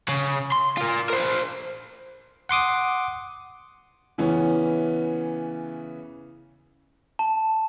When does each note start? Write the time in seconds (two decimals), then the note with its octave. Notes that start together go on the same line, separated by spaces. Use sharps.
0.09 C#3
0.52 C6
0.77 F4 A#4
1.10 A#4 C5
2.49 F#5 C6 D6 D#6
4.18 C#3 E3 B3 C#4
7.19 A5